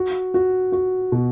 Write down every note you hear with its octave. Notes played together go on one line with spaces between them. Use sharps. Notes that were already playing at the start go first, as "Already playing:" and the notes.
Already playing: F#4
F#4
F#4
B2